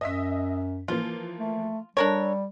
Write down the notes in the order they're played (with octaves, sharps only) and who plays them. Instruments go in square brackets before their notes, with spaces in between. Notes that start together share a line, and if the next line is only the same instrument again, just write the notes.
[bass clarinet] F#2 [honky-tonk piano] D#5 E5 B6
[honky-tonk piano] E3 F3 A#3 [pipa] F4
[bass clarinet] A3
[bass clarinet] G3 [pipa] D4 A#4 C#5 [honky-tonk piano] A4